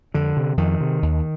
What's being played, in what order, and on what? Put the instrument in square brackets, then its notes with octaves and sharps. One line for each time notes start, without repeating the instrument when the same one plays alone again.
[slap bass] F2 D3
C3
F2 D#3
C3
D#2